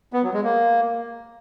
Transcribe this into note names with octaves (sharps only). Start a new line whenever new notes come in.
B3
F#3
G#3
A#3